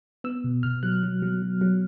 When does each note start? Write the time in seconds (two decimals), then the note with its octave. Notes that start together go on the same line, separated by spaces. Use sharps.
0.24 B3 E6
0.44 B2
0.63 B2 F6
0.83 F#3 F#6
1.03 F#3
1.22 F#3
1.42 F#3
1.61 F#3